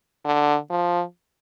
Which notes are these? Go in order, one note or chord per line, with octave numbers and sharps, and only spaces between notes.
D3
F3